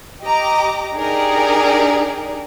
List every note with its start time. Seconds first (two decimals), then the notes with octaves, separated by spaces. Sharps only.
0.22 G4 D#5 A#5 D6
0.96 D4 D#4 G4 G#4 A#4 D5